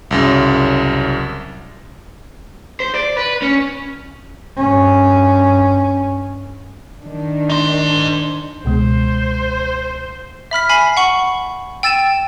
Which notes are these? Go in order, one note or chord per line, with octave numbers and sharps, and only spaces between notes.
C2 F#2 C#3
C5
D5
B4
C#4
G2 C#4
D#3 D4
D#4 C5
C#2 B2 G#3 C5
E5 B5 F6 B6
G#5 B5 C7
F#5 C#6 F#7
G5 E6 A6 D#7 E7